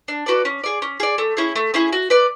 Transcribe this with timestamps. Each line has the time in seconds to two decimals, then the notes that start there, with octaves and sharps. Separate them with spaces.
0.08 D4
0.26 F#4 B4 D5
0.45 C#4
0.64 G#4 D5
0.82 C#4
1.00 G#4 D5
1.18 A3
1.37 C#4 E4 G#4
1.56 A3
1.74 C#4 E4 G#4
1.93 F#4
2.10 B4 D5